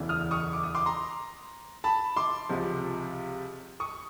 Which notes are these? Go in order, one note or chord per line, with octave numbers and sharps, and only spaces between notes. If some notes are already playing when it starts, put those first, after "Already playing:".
Already playing: E1 D2 C#3 E3
D#6 F6
C#6 D#6
D6
D#6
C6 D6
A#5 C6
A5 B5
C6 D6
C#2 C3 F3
C#6 D#6